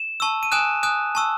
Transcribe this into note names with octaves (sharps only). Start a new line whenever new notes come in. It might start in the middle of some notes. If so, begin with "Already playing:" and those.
Already playing: E7
A5 C#6 E6
D#7
G#5 D#6 F#6 E7
G#5 D#6 F#6
A5 C#6 E6